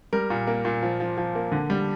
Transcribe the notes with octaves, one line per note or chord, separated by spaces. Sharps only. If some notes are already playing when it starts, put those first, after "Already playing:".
G3 A#4
A#2
A#3
A#2
F3
F3
F3
A#3
D3
G3